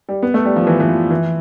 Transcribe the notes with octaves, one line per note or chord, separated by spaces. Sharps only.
G3
B3
A3
G3
F3
E3
E3
F3
E3